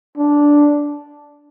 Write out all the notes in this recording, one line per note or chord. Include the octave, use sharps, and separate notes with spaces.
D4